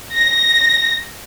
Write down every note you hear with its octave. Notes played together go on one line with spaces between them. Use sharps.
A#6